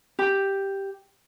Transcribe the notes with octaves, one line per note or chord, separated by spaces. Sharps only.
G4